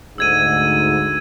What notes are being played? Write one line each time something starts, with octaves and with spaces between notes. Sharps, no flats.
D2 G#2 E6 G#6 D#7